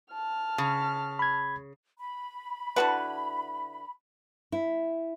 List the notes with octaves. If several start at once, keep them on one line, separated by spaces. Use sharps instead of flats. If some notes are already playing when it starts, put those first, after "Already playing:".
A5 F6
C#3
B5 G#6
B5
D3 E4 F#4 B4 F#5 A5
E4